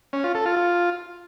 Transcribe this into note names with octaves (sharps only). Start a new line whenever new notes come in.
C#4
F4
A4
F4
F4